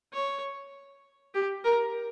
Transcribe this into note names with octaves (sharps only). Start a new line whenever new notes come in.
C#5
G4
A#4